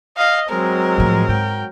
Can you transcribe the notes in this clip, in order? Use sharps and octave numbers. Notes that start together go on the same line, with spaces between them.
D#5 F5
F#3 G#3 C4 A#4
A2 F3
G#2 F#3 G5